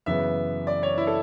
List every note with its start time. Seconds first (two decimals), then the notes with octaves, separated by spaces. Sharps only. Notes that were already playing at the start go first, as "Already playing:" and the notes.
0.06 F#2 C#3 E3 B3 E5
0.67 D5
0.83 C#5
0.97 E4
1.07 A4